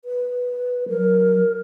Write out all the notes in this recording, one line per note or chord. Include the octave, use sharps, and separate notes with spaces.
B4
F#3 A#4